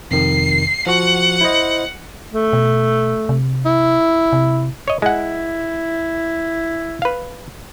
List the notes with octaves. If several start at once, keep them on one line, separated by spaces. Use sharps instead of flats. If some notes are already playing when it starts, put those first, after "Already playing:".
F2 C3 D#3 C7
F3 F#4 F#5
E4 C5 D#5
A3
B2
C3
E4
C3
C#5 D#5
G#3 E4 F#5
B4 F5